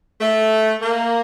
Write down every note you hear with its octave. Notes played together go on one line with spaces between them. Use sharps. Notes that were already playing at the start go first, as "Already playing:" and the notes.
A3
A#3